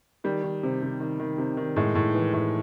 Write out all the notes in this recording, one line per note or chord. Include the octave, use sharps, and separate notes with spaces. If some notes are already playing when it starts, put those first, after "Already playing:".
D#3 G3
D#3
C3
C3
D#3
D#3
C3
D#3
A2 G#3
A2
E3
A2